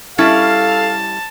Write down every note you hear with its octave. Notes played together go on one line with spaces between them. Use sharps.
G3 C#4 E4 A4 F5 A5